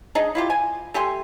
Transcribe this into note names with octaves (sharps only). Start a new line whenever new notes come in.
G#3 D4 D#4
E4 F4 G4
G#5
A3 G4 G#5 C6